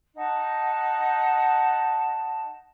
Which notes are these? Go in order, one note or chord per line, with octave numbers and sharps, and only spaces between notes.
D#4 F#5 A5